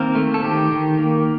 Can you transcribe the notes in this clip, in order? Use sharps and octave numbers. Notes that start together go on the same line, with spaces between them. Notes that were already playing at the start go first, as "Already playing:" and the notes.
Already playing: D#3 A#3 C4 A#4
A3
A4
D#3 G4
D#3
A#3